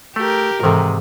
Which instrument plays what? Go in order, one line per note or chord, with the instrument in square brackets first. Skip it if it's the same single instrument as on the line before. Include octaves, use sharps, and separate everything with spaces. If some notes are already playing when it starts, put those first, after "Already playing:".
[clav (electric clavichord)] A3 [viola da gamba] G4 A#4
[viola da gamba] G#2 [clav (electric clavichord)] C3 D#3 [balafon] E3 A4